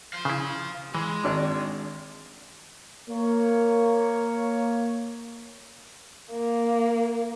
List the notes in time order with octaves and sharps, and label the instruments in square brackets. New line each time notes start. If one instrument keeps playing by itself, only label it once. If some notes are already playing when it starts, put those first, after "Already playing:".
[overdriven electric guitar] C5 F5
[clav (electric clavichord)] C#3 E4
[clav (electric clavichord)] E3 [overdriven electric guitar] G#3
[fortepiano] G#1 D4 D6
[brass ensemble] A#3 C#5
[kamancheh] A#3